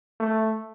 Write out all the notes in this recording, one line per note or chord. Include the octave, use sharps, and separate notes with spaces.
A3